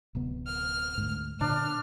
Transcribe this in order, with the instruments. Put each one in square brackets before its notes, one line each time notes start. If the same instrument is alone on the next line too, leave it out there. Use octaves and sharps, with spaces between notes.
[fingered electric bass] D1 C3 B3
[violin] F6
[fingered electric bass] D2 G#2
[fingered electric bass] A#2 D3 [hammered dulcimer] D4 [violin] F6